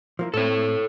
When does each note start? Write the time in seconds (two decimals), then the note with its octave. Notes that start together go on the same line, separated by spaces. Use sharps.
0.19 F3 A#3 E4
0.34 A2 C4 A4 C#5